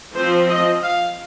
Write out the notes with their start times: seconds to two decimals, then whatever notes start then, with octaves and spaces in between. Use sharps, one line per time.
0.14 F3 C4 C5
0.48 D#5
0.82 F5